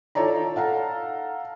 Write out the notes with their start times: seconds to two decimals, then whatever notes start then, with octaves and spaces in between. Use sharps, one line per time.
0.15 D#4 F4 A4 C#5 D5 A#5
0.56 A4 F5 F#5 A#5